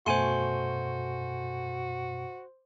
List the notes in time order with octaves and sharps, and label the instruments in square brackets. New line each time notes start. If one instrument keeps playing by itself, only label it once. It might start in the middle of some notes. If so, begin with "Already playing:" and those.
[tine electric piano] F#2 B2 [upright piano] A3 G#5 D#7 [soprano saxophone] F#4 [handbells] C5 C6